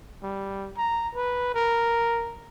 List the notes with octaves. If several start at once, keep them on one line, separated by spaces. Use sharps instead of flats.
G3
A#5
B4
A#4